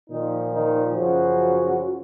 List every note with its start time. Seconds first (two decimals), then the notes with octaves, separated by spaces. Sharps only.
0.10 A#2 D#3 F3 D#4
0.53 D#3 D#4
0.95 F#2 C#3 F3 F#3 F#4